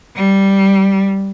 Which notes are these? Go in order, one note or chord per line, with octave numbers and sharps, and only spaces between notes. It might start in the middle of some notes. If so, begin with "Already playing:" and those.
G3